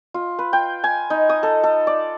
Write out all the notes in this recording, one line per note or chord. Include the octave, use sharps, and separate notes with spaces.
F4
B4
G5
G#5
D#4
D#6
A4
A4
D5